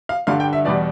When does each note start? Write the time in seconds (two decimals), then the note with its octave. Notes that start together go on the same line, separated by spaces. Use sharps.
0.09 F5
0.27 G2 D3 G3 F5
0.40 G5
0.53 E5
0.65 E2 B2 G3 D5